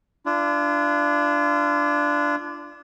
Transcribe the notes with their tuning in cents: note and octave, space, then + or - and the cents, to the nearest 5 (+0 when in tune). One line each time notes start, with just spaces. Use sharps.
D4 +0 F4 -35